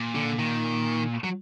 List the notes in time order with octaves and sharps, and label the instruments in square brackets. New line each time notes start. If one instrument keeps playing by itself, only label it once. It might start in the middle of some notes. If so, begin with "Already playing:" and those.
Already playing: [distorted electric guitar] A#2
[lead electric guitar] D3
D#3
F#3